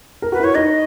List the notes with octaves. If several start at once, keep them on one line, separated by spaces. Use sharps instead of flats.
A#4
F#4 B4
E4 C#5
D#4 D#5